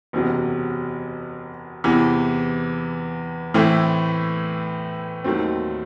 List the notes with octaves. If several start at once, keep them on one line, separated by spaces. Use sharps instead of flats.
F#1 E2 C3 F#3
E2 C3 E3
A2 E3 A3 C4 E4
D#2 D#3 F#3 A3 C4